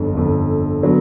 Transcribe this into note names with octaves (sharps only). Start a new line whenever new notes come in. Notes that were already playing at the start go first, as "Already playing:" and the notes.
Already playing: G1 F2 D3
G1 F2 D3
D3 F#3 B3